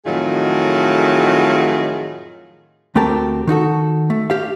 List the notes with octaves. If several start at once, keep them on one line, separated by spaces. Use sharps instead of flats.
F2 A2 D#3 F#3 F4 G#4
D2 A3 C4 G4 A#4 A5
D#3 D#4 F#4 A4
A3
G4 F5